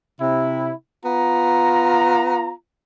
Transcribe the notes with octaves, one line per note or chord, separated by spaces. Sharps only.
C3 E4
B3 F4 A#5